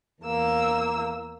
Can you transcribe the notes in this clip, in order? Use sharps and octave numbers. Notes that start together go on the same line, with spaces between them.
E2 A#3 E6